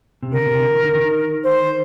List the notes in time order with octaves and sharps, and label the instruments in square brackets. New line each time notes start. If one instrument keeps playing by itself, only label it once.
[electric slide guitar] C3
[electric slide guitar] D3 [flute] A#4
[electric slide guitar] C3
D3
D#3
D3
D#3
[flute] C5